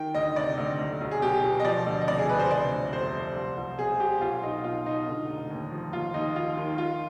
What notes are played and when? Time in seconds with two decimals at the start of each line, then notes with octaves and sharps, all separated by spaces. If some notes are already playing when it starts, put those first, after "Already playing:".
Already playing: D#3 G5
0.14 D2 D#5
0.36 C3 D5
0.58 D2
0.79 B1
1.01 B1
1.11 G#4
1.22 B2 G4
1.44 B2
1.60 D#5
1.65 F3 D5
1.87 D2
2.01 D#5
2.07 C3 D5
2.19 G#4
2.29 D2 B4
2.39 C5
2.50 C3 D5
2.71 G1
2.93 F2 C5
3.14 F3
3.36 C2
3.57 C2
3.78 B2 G#4
4.00 B2 G4
4.21 B1 F4
4.43 B1 D#4
4.64 B2 F4
4.86 B2 D#4
5.07 D3
5.29 F1
5.50 D#2
5.71 F3
5.92 D#2 F4
6.14 D#2 D#4
6.35 D#3 F4
6.57 D#3
6.78 D#3 F4